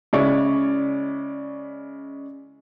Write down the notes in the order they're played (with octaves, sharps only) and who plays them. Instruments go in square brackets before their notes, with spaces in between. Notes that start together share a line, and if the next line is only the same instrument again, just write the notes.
[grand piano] C#3 G#3 E4 C#5 D5 C#6